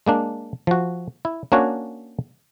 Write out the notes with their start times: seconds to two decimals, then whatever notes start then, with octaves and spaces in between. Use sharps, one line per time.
0.06 G#3 A#3 D4
0.67 F3 F#4
1.25 E4
1.52 A#3 C#4 D4 F#4 C#5